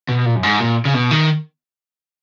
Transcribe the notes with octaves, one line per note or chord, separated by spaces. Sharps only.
B2
A#2
F#2
G#2
A#2
C#3
B2
D#3